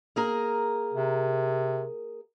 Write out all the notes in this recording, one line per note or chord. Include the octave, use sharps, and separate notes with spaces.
A#3 G#4 A#4
C3